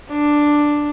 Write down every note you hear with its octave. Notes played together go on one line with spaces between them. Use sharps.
D4